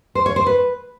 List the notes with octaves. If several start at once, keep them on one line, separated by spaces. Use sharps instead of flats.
C5
C#5
C5
B4